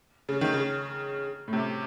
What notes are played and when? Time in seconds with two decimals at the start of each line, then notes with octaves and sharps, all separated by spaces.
0.29 C#3
0.41 D#3
0.53 C#3
1.48 A2
1.53 C3